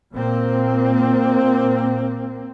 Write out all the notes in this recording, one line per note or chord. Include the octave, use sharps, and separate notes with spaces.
A#2 A#3 C4